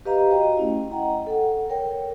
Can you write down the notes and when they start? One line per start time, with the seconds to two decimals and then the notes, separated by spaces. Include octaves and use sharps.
0.06 G4 B4 D#5 F5 A#5
0.30 F#4 C5 D#5 G5 A#5
0.57 A3 C#4 E4
0.91 D#5 F#5 G5 A#5
1.27 A4 F#5
1.70 A#4 C#5 G5